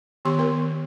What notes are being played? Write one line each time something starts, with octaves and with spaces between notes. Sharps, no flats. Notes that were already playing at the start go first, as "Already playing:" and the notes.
D#3 B3 G4 C6
B3 A#4